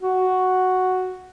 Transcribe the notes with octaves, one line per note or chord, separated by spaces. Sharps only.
F#4